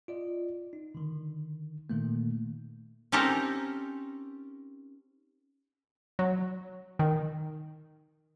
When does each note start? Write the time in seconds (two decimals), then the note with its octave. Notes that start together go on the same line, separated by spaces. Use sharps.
0.08 F4 D5 D#5
0.73 D#4
0.95 D3 D#3
1.90 A#2 D#3 A3 A#3
3.12 C4 C#4 D#4 G4 A4 A#4
6.19 F#3
6.99 D#3